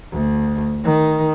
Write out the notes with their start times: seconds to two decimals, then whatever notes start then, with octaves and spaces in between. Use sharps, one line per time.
0.12 D2
0.84 D#3